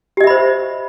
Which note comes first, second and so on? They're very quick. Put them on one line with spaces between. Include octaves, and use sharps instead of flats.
G4 D#5 E5 B5 C5